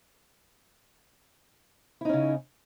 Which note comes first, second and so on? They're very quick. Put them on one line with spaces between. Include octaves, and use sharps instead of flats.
E4 D#4 C#4 C#3